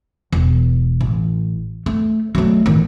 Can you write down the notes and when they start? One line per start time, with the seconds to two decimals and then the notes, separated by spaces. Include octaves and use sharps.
0.33 E1
1.01 A1
1.86 A3
2.35 F#3 A3
2.66 A1 D#3